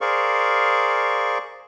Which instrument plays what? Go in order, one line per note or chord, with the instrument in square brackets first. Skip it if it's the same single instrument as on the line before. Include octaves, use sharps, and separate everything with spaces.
[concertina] G#4 A#4 C5 D5 F5 C#6